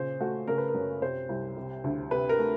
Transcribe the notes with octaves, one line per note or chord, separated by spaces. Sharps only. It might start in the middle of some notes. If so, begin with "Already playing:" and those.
Already playing: A#2 C#3 C5
A3 F#4
C#3 A#4
B4
A#4
F#2
C3 C5
C2
C3
D2
C3 B4
A#4
A3